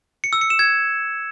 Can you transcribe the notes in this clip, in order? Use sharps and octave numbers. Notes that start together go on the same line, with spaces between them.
C#7
E6
C#7
E7
G#6